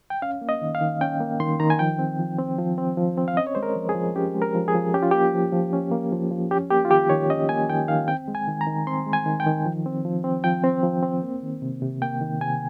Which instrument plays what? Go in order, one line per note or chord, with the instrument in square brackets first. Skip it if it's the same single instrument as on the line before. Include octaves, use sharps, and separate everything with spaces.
[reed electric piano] G5
C#4 F5
A#3
D#5
D#3
F5
D#3
C#4 G5
A#3
D#3 C6
D#3 A#5
G#5
F3 G5
C4
F3
C4
F3
C4
F3
C4
F5
C#4 D#5
C#5
G#3 C5
A#4
F3
G#4
F3
C#4 G4
G#3
A#4
F3
G#4
F3
C#4 G4
F4
A#3 G4
F3
F3
C#4
A#3
F3
F3
C#4 G4
A#3 G4
F4
D#3 G4
D#3 C#5
C#4 D#5
A#3 G#5
D#3 G5
D#3 F5
C4 G5
G#3
G#5
D#3
A#5
D#3
C4 C6
G#3
G#5
D#3
G5
D#3
F3
C4
F3
C4
F3 G5
C4
F3
C4
A#3
D#3
C3
C3
A#3 G5
D#3
C3 G#5